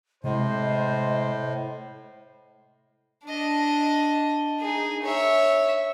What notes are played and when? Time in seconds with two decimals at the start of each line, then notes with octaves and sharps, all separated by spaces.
0.24 A2 C3 G#3 C5 D#5
3.24 D4 D#5
4.60 D#4 G#4
5.03 C#5 E5